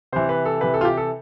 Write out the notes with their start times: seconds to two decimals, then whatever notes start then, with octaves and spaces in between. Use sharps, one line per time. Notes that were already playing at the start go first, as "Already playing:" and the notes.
0.12 C3 E3 C5
0.29 B4
0.45 A4
0.61 C3 E3 B4
0.74 A4
0.81 F4
0.85 G4
0.97 A4